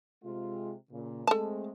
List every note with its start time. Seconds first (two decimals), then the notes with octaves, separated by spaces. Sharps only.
0.24 C3 G#3 F4
0.91 A#2 C#3
1.27 G#3 A3 C4 A4 A5